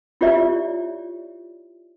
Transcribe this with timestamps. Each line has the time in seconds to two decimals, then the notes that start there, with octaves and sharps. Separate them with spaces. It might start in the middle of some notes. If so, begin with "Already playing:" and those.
0.21 E4 F4 G4 C#5 D5 E5